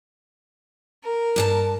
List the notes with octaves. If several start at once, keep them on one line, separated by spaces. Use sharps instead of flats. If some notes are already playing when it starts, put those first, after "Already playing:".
A#4
G2 G#4 A5